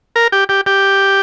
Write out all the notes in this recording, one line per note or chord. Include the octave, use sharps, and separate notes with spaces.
A#4
G4
G4
G4